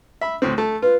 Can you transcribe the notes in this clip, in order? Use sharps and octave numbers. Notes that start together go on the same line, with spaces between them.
E5 B5
D2 A2 C4
A3 A5
F4 B4